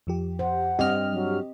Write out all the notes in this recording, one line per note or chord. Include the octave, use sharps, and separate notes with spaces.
F2 F3 G4
C5 F#5
G2 C4 G4 D#5 F6
F#3